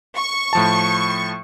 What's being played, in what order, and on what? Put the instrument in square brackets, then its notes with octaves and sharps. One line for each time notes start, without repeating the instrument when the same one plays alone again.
[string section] C#6
[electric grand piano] A2 F3 A5